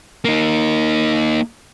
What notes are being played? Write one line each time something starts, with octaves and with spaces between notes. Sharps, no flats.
A#3 D#4